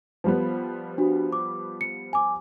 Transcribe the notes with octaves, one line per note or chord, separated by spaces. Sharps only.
F3 G3 B3
D4 F#4
D6
C#7
G#5 D6